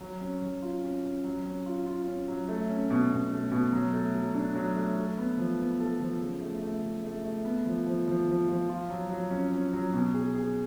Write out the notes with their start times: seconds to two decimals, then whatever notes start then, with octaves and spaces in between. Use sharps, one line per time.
0.01 F#3
0.20 C#4
0.42 F#3
0.62 F4
0.83 C#4
1.03 C#4
1.24 F#3
1.45 C#4
1.66 F4
1.87 F4
2.07 C#4
2.28 F#3
2.48 A3
2.70 C#4
2.90 B2
3.11 B2
3.31 A3
3.52 B2
3.72 F#3
3.93 A3
4.14 F#3
4.34 D4
4.55 F#3
4.75 A3
4.97 A4
5.18 B3
5.38 F3
5.59 B3
5.80 A4
6.00 F3
6.21 C#3
6.42 A3
6.62 A3
6.83 C#3
7.04 A3
7.24 A3
7.45 B3
7.66 F3
7.86 F3
8.08 F3
8.28 F3
8.49 F3
8.69 F4
8.90 F#3
9.10 F#3
9.31 C#4
9.52 C#4
9.73 F#3
9.93 B2
10.14 G#4
10.34 G#4